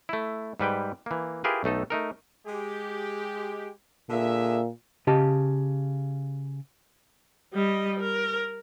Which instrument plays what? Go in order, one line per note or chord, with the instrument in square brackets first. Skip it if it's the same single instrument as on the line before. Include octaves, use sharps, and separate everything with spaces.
[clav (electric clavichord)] A3 E4
G#2 G3 B4 G5
E3 A#3
E4 F4 G4 G#4 A#4 B4
B1 A3 D#4 A4
A3 D#4 A#4
[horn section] G#3 G4
[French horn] A#2 [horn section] D3 G#4 E5
[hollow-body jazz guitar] C#3 G4 D#5 A5
[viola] G3 D#5
A#4